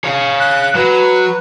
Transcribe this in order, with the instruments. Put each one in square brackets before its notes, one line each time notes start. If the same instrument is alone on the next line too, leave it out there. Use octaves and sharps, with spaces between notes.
[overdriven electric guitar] C#5 F5
[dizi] F#6
[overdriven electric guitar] F#3 [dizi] B4